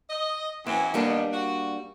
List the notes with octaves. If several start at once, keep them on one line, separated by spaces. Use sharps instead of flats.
D#5
F#2 E3 C4
D#2 B2 G3 A#3 D4
F#4